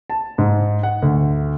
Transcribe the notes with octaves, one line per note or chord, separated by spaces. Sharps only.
A5
G#2
F#5
D2